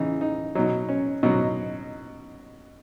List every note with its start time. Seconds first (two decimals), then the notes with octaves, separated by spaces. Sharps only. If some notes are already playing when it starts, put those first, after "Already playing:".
Already playing: C#3 E3 D#4
0.21 D#4
0.55 B2 F#3 D#4
0.89 C#4
1.23 B2 F#3 D#4